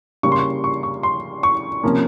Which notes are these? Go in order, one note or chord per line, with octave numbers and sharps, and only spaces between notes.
C#3 G3 A#3 C#6
C6
C#6
C#6
C#6
C6
C#6
C3 F3 A#3 C#4